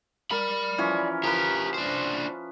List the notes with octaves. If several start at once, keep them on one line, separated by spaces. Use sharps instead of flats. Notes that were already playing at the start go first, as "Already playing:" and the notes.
A#4 D5 B5
E3 F3 C#4
F3 G4 A#4 B4
D4 C5